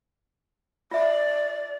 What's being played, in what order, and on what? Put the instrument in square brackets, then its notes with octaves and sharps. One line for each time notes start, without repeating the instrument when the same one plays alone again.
[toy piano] F4 E5 [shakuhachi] D5